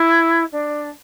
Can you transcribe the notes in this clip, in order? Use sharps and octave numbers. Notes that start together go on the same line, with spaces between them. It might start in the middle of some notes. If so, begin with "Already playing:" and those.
Already playing: E4
D4